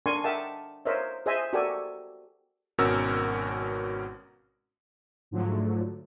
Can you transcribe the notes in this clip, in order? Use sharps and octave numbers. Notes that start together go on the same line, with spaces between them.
D4 A#4 G#5 C6 C#6
A#4 D#5 E5 F#5 G5 A5
A#4 C5 C#5 D#5 E5
G#4 C5 D#5 E5 G#5
F#4 G4 A4 A#4 D5 G#5
G#1 B2 C#4 F#4 A#4 E6
G#2 D3 F3 F#3 A3